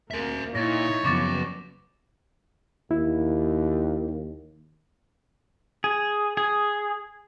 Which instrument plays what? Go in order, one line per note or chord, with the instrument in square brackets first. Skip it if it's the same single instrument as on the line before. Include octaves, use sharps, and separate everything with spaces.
[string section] D2 A#3 [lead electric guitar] A#4 E5
[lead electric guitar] A#2 [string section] D#4 E4 [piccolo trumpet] C#5 [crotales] A6 A#6
[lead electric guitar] F#2 C#3 [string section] F3 B3 [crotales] C#6 D6 A6
[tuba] D#2 [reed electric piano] E4
[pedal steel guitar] G#4
G#4